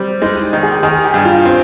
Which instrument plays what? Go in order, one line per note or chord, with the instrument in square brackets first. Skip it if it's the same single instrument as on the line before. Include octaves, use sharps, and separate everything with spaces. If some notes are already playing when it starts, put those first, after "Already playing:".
Already playing: [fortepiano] G3 C4
[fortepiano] G#3 [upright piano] D#4
[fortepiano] D#3
[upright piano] G#4
[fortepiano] D#3 [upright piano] G#4
[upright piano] G4
[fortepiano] G2
[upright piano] F4
[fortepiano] C4